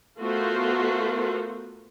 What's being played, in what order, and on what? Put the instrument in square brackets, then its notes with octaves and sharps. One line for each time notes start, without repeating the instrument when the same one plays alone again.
[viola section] A3 B3 F4 F#4 A#4 C5